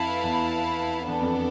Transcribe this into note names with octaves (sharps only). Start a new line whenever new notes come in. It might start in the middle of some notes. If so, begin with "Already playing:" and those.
Already playing: F2 E4 B4 F5 A5
E2
E2 B3 D4 A4
F2